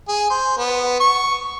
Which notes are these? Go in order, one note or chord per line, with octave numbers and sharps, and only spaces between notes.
G#4
C5
B3
C#6